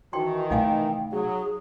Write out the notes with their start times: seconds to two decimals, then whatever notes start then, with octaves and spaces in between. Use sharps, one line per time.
0.13 D#3 E3 F#4 G5 A5 C6
0.50 C3 A3 D#4 F5 G5 G#5
1.12 F#3 G#4